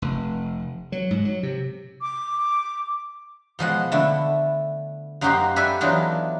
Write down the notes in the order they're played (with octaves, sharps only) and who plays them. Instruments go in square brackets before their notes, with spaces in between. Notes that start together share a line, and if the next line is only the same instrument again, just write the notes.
[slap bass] F1
F#3
G#2
F#3
C3
[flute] D6
[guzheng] B2 F3 G#3 F#5
D3 A3 E4
F#2 A#3 D#4 F#4 G4 C5
G4 A4 B4 D5 E5 G#5
E3 F#3 B3 D4 D#4 F4